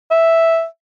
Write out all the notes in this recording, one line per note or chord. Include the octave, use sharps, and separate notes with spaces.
E5